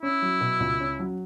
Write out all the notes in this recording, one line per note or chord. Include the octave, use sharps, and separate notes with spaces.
C#4 E4
F#3
B2
C#2
C#4
F#3